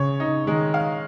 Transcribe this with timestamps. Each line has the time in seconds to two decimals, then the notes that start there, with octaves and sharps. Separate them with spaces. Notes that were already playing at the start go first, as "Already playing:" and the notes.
Already playing: C#3 C#5
0.20 D#4
0.46 D#3 G#3
0.74 F5